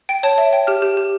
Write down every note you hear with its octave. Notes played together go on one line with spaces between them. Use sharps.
G5
C#5 A5
E5
G5
G4 F6
G4
G4